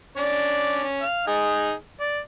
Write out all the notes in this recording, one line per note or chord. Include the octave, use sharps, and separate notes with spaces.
C#4 D4 D5
C#4
F5
D#4 G#4
D5